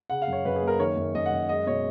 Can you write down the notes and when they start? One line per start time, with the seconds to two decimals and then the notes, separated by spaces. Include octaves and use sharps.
0.10 C#3 F#5
0.22 F5
0.27 F#2
0.33 C#5
0.45 F#2 B4
0.56 G#4
0.62 A#3
0.68 A#4
0.79 D#3 C#5
0.97 F#2
1.15 F#2 D#5
1.26 F#5
1.32 F#2
1.49 G#3 D#5
1.67 B2 C#5